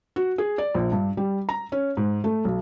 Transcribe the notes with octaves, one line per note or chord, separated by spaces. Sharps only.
F#4
G#4
D5
A#1
G2
G3
A#5
C#4
G#2
A3
B1